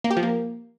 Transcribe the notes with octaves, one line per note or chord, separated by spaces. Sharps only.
A#3
G4
F3
A#3